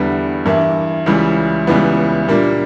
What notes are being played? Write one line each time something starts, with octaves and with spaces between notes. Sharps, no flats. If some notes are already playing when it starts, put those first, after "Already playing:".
Already playing: E2 D3 G3 B3
G2 E3 A#3 E4
C#2 C#3 E3 G3
C#2 C#3 E3 G3 B3
A#2 G3 A#3 D4